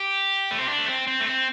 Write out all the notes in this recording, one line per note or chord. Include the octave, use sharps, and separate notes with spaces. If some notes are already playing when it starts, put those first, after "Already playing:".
Already playing: G4
A3
C4
D4
A3
C4
C4
A3
C4